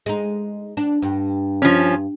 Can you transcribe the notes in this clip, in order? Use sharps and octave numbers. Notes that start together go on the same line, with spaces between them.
G#3 D#4
D4
G2
F3 C#4